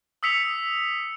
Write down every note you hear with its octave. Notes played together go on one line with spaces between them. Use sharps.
D#6 E6 B6 C#7 F7